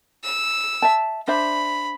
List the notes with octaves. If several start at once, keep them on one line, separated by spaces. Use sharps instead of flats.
E6
E5 A5
D4 C5 E5 B5